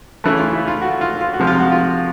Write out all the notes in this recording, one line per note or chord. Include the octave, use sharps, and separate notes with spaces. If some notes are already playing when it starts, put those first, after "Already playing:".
C#3 E3 A3 E4
F4
E4
F4
F#4
F4
F4
F#4
C3 F3 G#3
F4
F#4
F4